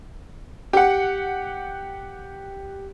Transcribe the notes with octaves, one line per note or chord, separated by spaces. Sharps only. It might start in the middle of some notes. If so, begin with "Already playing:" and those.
G4 F#5